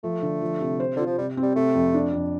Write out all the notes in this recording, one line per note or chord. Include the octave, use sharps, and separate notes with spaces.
F3 A3
D3
F3
C3
C5
D3 F4
F3
C3 G3
C4
G3
C3 A3
F2
D4
F2